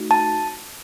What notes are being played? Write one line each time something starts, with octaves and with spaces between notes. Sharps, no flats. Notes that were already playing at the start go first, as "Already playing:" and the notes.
Already playing: A3 D#4 F#4
A5